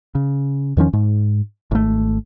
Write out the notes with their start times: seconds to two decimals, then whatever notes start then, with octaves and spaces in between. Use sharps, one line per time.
0.15 C#3
0.77 E2 D#3 F3 C#4
0.93 G#2
1.71 G#1 A3